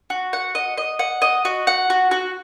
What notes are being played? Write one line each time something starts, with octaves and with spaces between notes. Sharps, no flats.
F#4
F#5
D#5
D#5
F#5
D#5
F#4
F#5
F#4
F#4